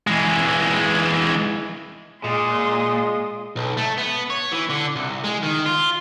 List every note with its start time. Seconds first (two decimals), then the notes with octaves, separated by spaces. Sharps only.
0.07 E3 G#3
2.24 A#2 G#3 C6 D#6
3.56 B1
3.77 A3
3.98 B3
4.30 C#5
4.52 E3
4.70 D3
4.96 C2
5.24 G#3
5.43 D#3
5.65 F4